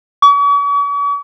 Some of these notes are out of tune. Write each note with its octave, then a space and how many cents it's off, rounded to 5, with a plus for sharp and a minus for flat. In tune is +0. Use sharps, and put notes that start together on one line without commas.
C#6 +45